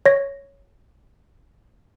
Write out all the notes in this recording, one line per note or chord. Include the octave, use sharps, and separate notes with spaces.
C#5 A#6